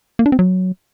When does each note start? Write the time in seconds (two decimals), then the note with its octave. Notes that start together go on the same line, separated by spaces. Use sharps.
0.19 A#3
0.26 D4
0.32 C4
0.39 F#3